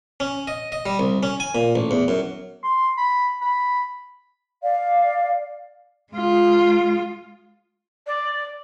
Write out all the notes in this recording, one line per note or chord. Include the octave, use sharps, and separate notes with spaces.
C#4
D#5
D#5
G3
C2
C#4
G#5
A#2
A1
E2
F#2
C6
B5
B5
D5 F5
G#3 F4
D5